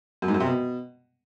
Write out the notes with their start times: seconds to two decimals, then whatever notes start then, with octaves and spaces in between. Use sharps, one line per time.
0.22 F#2
0.28 G#2
0.34 F#2
0.40 C3
0.46 B2